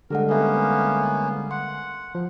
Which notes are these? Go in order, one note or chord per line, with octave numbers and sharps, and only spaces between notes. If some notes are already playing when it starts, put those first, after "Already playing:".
D3 G3 G#3 G4 A4 A#4 F#5
A#3 B3 C#4 A4 E5
F#5 C6
F3